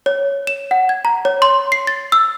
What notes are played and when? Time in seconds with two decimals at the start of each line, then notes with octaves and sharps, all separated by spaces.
0.06 C#5
0.47 E7
0.71 F#5
0.89 G#6
1.05 A#5
1.25 C#5
1.42 C6
1.72 C7
1.87 A6
2.12 E6